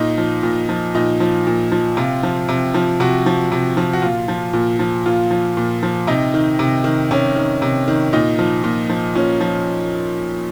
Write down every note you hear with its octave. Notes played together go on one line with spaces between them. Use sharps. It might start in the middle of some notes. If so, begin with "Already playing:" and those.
Already playing: A#2 D#4
F3
A#2
F3
A#2 D#4
F3
A#2
F3
C3 F4
F3
C3
F3
C3 F#4
F3
C3
F3
F#4
A#2 F4
F3
A#2
F3
A#2 F4
F3
A#2
F3
C3 D#4
D#3
C3
D#3
C3 C#4
D#3
C3
D#3
A#2 D#4
F3
A#2
F3
A#2 C#4
F3